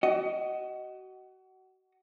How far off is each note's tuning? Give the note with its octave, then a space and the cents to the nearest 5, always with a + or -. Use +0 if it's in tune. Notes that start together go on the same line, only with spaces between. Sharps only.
F#4 +30 D#5 +0